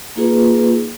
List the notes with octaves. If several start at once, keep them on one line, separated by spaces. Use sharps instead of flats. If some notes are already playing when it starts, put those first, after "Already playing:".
A#3 D#4 F4 G#4 B4